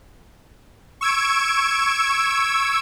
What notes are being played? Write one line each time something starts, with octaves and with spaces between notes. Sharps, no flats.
C#6 E6 G#6 D7